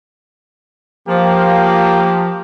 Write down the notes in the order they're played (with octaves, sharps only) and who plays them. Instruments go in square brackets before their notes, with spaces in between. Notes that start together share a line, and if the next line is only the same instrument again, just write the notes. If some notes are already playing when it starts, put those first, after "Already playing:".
[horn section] F3 [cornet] A#3 [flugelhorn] G4